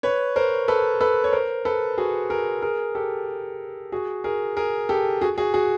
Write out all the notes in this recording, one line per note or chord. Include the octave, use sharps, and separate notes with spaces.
B4 C#5
A#4 C5
A4 B4
A4 B4
C#5
A#4 C5
A4 B4
F#4 G#4
G#4 A#4
G#4 A#4
G4 A4
F#4 G#4
G#4 A#4
G#4 A#4
G4 A4
F#4 G#4
F#4 G#4
F#4 G#4